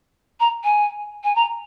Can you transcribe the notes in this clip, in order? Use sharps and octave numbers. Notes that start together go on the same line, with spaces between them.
A#5
G#5
G#5
A#5